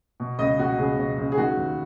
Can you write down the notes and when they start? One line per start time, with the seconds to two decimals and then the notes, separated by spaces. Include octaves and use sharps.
0.20 B2
0.39 C#2 D#5
0.58 B2 F#4
0.78 C#2 G#4
0.98 B2
1.18 C#2
1.32 G#4
1.38 D#3 F#4
1.57 D#2